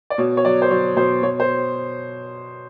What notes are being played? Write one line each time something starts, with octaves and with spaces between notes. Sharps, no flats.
D5
B2 C#5
C#5
F#3 D5
C5
F#3 C#5
B2 C5
B2 C#5
C5